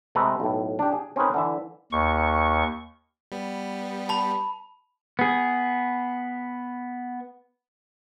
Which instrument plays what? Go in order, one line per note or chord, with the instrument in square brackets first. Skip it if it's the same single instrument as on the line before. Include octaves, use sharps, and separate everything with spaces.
[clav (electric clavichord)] C3 G#3 A3 A4 B4 A#5
B1 A2
D4 G4
G#4
C4 C#4 D#4 G#4 A#4 B4
D3 E3 E5
[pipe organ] D#2 C#6
[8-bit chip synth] G3 B3
[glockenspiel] A5 B5
[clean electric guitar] B3 G#4